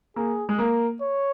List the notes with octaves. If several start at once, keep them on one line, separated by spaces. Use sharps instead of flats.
A#3 G#4
G#3
A#3 A#4
C#5